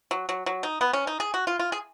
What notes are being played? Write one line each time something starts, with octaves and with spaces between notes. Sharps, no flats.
F#3
F#3
F#3
D#4
B3
C#4
D#4
G#4
F#4
F4
F4
G#4